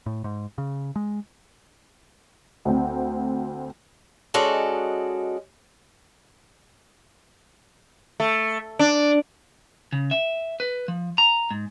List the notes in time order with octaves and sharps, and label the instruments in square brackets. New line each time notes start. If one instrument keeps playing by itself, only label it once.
[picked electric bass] A2
G#2
C#3
G#3
[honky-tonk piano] D2 C4
[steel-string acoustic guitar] G#3 C#4 F#4 A4 D5 D#5
[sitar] A3
D4
[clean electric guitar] C#3
E5
B4
F3
A#5
G#2